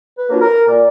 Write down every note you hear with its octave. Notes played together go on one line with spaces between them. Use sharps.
B4
F#3 A#3 D4 F4
A#4
A#2 D5